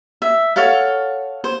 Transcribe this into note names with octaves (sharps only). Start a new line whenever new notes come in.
E5
A4 C#5 F5 F#5
C5